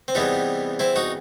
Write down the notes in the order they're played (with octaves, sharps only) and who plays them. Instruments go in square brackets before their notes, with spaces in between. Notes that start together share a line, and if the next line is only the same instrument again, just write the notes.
[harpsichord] C4
E2 C3 E3 G3 B3 D#4
C4 E4
D#4 F#4